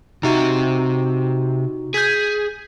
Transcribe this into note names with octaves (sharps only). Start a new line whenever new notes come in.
C3 D#4 F#4 E5
G#4 G6 G#6 B6